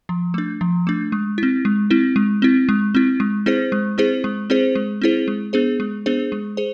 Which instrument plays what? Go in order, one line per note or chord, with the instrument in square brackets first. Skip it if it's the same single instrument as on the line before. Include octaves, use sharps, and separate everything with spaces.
[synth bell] F3
A3 D4
F3
A3 D4
G#3
C4 E4
G#3
C4 E4
G#3
C4 E4
G#3
C4 E4
G#3
C4 E4 G#4 C5
G#3
C4 E4 G#4 C5
G#3
C4 E4 G#4 C5
G#3
C4 E4 G#4 C5
G#3
B3 D4 G#4 C5
G#3
B3 D4 G#4 C5
G#3
G#4 C5